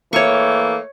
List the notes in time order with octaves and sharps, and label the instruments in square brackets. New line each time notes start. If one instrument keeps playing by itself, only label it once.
[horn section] E3 A3 A#3 [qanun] C#5 C#6